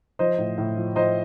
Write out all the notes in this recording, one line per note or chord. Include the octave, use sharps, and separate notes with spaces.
F3 C5 D#5
A2
A2
F3
F3 C5 D#5